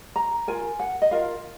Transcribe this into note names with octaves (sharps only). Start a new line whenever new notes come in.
A#5
F4 A#4 G#5
F#5
D#5
F4 A#4 F5